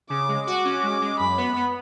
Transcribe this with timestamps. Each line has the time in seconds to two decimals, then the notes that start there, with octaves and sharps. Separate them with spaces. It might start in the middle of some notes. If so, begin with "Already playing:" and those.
0.10 C#3 D6
0.28 G#3
0.46 F#4 D6
0.65 C#4
0.83 G#3
1.01 G#3
1.19 F#2 B5
1.37 B3
1.56 B3